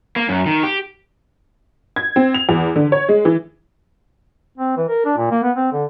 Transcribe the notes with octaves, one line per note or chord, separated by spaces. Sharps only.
A#3
F#2
D#3
G4
G#6
C4
F7
E2
D3
C#5
G#3
E3
C4
E3
A#4
D4
A#2
A#3
B3
C4
D3